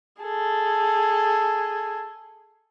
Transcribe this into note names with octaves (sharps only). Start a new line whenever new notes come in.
G#4 A4